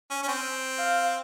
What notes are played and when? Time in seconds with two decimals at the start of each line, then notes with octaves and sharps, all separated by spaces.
0.11 C#4
0.23 C#4
0.28 C4
0.78 F5